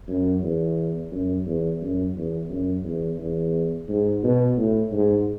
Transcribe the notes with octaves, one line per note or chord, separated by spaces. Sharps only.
F#2
E2
F#2
E2
F#2
E2
F#2
E2
E2
G#2
B2
A2
G#2